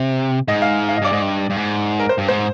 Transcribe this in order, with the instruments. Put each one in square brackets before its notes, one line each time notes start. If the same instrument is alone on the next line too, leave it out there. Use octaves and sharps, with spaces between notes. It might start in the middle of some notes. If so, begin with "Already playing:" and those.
Already playing: [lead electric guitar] C3
[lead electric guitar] G#2 [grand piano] D#5
[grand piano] F5
F5
D#5
[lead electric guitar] G2 [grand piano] D5
[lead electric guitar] G#2 [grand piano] D#5
[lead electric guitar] G2
G2
G#2
[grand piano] A#4
C5
[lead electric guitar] G2
[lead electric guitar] G#2 [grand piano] C5